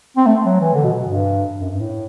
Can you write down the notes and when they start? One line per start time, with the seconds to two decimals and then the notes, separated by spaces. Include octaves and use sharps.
0.17 C4
0.27 A3
0.46 F#3
0.60 E3
0.75 D3
0.84 B2
1.03 G2
1.60 F#2
1.70 G2
1.80 A2